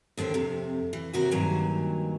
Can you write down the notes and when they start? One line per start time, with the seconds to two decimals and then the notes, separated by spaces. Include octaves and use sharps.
0.17 D#2 D3 C4 G4
0.34 F2 C3
0.93 E3
1.13 D#2 C3 D#3 E3 F#4 A#4
1.31 G2 A#2 D#3 F#3 G#5 A#5